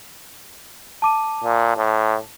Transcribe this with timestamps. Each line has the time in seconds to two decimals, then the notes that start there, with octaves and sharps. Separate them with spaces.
1.02 A5 D6 D#7
1.44 A#2
1.77 A2